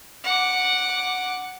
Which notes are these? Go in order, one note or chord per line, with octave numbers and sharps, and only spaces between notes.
F#5 D6